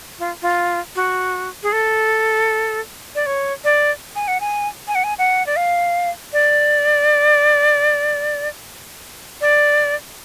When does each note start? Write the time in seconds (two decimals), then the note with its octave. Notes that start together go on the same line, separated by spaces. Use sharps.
0.19 F4
0.42 F4
0.95 F#4
1.63 G#4
1.72 A4
3.15 D5
3.26 C#5
3.64 D5
4.16 G#5
4.28 F#5
4.40 G#5
4.88 G#5
4.95 F#5
5.04 G#5
5.18 F#5
5.46 D5
5.56 F5
6.33 D5
9.41 D5